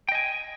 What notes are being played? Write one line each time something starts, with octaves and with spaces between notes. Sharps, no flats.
D#5 G5 G#5